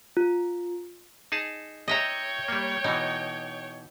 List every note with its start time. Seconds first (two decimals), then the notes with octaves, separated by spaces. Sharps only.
0.17 F4
1.32 D#4 G#4 A5
1.88 C#5 D#5 E5 G5 A#5
2.48 G3 A#3
2.84 B2 E3 D#4